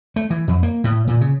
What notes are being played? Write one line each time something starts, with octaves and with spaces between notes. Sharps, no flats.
A3
E3
F2
A#3
A2
A#2
C#3